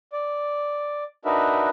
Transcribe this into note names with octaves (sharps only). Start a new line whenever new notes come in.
D5
D4 D#4 F#4 A#4 B4 E5